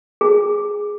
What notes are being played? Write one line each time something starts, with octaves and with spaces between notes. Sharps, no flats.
G#4